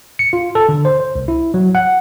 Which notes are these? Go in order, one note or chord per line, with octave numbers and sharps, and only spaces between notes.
C#7
F4
A4
D3
C5
C5
C2
E4
F#3
F#5